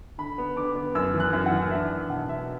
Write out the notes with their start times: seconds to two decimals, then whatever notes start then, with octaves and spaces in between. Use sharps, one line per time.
0.18 D3 B5
0.38 B3
0.56 D3 D6
0.76 B3
0.95 F#2 E6
1.14 E3
1.20 F#6
1.33 F#2
1.46 F#5
1.52 E3
1.71 D4 E5
1.91 D4
2.10 B2 F#5
2.29 B2 E5